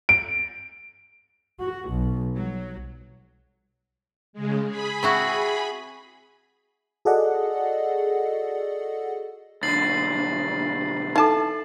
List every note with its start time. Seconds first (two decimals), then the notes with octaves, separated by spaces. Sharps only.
0.09 D7
1.60 F#4
1.90 B1
2.36 F#3
4.33 C#3 G#3
4.66 G#4 B5
5.03 C4 E4 F#4
7.05 F#4 G#4 A4 D5 D#5 F#5
9.63 B1 D3 A6 C7 F#7
11.16 E3 D#4 A4 A5